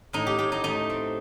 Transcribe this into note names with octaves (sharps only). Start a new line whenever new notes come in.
A2 D#4
G4
A2 G4
D#4
A3 D#4
C4